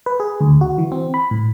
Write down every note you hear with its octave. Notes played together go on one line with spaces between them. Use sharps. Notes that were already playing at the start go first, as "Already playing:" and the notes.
B4
G#4
D2
F#4
E3
C4
B5
A2